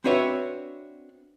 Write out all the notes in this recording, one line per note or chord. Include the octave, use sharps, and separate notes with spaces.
C4 D4 F#4 B4 C#5 E5